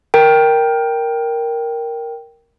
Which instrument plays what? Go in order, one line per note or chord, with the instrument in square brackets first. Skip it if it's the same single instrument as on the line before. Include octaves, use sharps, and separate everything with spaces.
[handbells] A#4 G5